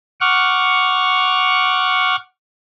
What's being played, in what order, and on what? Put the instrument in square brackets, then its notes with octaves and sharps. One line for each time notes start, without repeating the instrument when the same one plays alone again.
[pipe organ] F#5 C#6 D6 F6